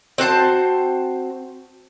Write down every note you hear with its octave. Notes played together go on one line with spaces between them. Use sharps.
C4 F#4 C5 A5